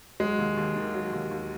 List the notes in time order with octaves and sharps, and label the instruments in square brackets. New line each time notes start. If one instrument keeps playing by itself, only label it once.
[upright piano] F#3 [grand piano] G#3
[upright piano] D#2
D#2
D#3
F#3
D#2
D#2